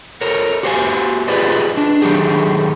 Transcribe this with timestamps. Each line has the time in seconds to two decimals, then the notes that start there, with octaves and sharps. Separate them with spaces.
0.21 A4 A#4 C#5
0.63 F#4 G4 C5 C#5 F5 G#5
1.28 F4 G4 G#4 B4 D5 D#5
1.77 D4
2.02 D#3 F#3 A3 G4 G#4